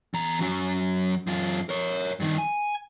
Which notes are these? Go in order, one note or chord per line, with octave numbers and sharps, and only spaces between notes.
E2 A#5
F#2 F#3
F#2 F4
A#4 C#5
G2 D#3
G#5